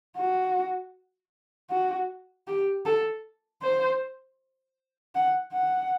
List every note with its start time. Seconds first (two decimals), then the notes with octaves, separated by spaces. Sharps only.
0.17 F#4
1.70 F#4
2.47 G4
2.85 A4
3.62 C5
5.15 F#5
5.53 F#5